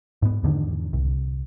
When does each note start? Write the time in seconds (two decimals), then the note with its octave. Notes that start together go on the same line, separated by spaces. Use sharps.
0.22 G#2 B3
0.44 E2 G#2 D3 D#3
0.93 C2